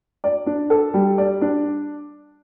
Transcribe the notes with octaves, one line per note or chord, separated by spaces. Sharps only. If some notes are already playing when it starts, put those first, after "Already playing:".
D5
D4
A4
G3
D5
D4